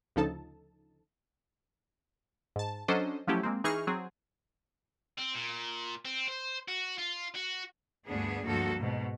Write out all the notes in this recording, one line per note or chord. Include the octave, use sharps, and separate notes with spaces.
D2 C#3 F3 D#4 A4 A5
G#2 A5
F#3 C#4 D4 A4 C5 D#5
F3 F#3 A3 C#4 E4 G4
G#3 A#3 C4
E3 D#4 G#4 C#6 F6
F#3 C4 G#4
C4
A#2
C4
C5
F#4
F4
F#4
D2 G2 B3 D4 G#4
D2 G2 F3 A#3 F#4 A4
G#2 B2